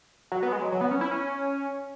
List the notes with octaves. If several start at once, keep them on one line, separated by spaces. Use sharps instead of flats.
F#3
B3
G#3
F#3
F#3
B3
C#4
E4
C#4